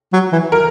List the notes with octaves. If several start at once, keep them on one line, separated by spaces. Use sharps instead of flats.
F#3
E3
A#4